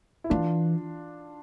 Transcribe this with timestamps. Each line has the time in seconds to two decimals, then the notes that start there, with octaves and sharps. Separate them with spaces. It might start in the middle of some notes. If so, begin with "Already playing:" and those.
0.24 E4
0.30 E3 D4 F4